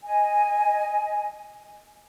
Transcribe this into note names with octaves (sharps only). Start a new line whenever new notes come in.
D#5 G#5